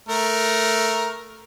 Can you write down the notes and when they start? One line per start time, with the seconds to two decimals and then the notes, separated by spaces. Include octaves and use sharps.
0.09 A3 A#4